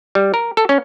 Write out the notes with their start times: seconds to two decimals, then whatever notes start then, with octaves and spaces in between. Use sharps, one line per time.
0.15 G3
0.34 A#4
0.57 A4
0.69 C#4